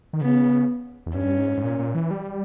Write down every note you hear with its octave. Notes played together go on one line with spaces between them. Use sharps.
D#3
C#3 B3
E2
G2 C#4
G#2
G#2
A#2
A#2
E3
G3